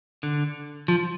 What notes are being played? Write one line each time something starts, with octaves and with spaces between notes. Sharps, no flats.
D3
F3